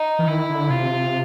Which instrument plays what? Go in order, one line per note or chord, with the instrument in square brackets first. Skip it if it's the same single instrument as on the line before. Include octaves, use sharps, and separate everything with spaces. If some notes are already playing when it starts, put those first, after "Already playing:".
Already playing: [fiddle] D#4
[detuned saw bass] E3
[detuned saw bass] D#3 [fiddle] E4
[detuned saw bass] D3
[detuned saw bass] C3 [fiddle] F4